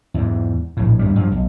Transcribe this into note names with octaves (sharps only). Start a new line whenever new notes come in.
E2 G#2
A#1 A2
D2 G2 G3
G2 F3
B1